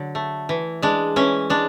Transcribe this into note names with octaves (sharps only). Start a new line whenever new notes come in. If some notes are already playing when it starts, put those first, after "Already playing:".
Already playing: D3 F#3
A3
E3
G#3 D4
E3 C#4
G#3 D4